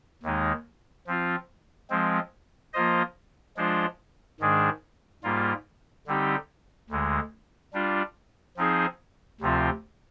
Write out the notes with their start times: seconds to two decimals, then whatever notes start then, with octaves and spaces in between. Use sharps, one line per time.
0.23 D#2 D#3 G#3 D#4
1.07 F3 C4 F4
1.90 F3 G#3 C4
2.73 F3 A#3 F4 C5 D#5
3.57 F3 G#3 D4 F4 C5
4.40 G#2 D#3 G#3 D4 G#4
5.24 G#2 G3 A#3 F4
6.07 D3 G3 C4 D#4 G4
6.90 D2 D3 G#3
7.73 G3 D4 F4
8.57 F3 C4 D#4 G#4 C5
9.41 D2 C3 F3 C4 F4